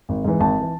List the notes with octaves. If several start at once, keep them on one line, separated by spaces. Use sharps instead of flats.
G#1
G#2 E3
G#1 A5
E3